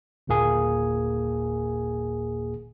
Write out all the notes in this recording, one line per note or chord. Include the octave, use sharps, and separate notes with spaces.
G1 D#2 A#2 A#3 G#4 G#5